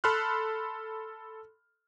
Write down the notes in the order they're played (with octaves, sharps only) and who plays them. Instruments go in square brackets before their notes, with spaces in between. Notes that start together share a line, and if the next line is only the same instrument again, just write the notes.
[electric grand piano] A4 B5 C6 F6 F#6